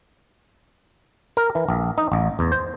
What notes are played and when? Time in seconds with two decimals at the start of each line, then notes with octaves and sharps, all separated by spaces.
1.37 A#4
1.55 E3
1.68 A#1
1.98 D#4
2.12 A1
2.39 E2
2.52 C5